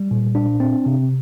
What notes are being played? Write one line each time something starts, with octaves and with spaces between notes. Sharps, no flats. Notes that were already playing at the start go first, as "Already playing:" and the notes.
Already playing: G3
A#2
D4
C4
C3